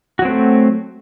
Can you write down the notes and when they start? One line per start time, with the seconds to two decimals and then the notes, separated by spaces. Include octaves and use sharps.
0.19 F#4
0.22 F#3
0.25 C4
0.28 A3